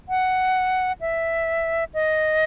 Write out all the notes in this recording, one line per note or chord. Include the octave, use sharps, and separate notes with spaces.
F#5
E5
D#5